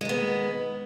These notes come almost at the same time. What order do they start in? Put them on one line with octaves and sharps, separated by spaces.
G#3 D#3 B3